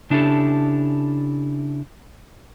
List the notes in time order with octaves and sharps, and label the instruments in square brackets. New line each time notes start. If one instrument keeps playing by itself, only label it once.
[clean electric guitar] C#3 D4 E4 G4 A4